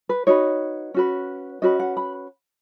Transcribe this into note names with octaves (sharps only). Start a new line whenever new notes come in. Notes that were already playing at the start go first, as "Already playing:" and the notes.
B4
D#4 F#4 B4 C#5
C#4 F#4 B4
C#4 F#4 B4 D#5
F#5
B5